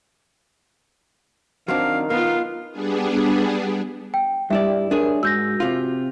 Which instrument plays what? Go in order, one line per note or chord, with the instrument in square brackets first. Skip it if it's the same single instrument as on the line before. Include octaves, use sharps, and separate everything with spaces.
[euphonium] D#3 [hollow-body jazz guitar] F#3 C4 D4 [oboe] F5
[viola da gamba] B3 F4 [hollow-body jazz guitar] A#4 [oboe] F5
[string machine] G3 B3 D4 G#4
[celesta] G5
[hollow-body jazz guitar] G2 E4 D5 [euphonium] G3 [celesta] E5
[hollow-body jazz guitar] D4 G#4 C#5 [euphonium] A#4
[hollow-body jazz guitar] G#2 [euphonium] F#4 [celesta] E6 G6 A#6
[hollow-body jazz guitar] C3 F4